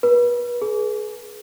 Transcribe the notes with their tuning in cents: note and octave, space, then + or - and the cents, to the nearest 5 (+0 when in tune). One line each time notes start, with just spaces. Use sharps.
B4 -35
G#4 +25